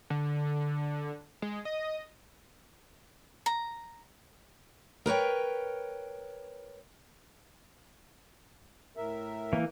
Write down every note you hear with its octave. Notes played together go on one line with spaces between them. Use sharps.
D3
G#3
D#5
A#5
A#4 B4 C#5 G5
A2 A#4 E5
E3 A#3